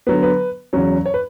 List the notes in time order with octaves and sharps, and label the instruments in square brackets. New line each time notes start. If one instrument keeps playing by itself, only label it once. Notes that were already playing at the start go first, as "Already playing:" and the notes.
[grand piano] D3 F#3 B3 B4
B4
E2 C#3 F#3 C#4
C#5
B4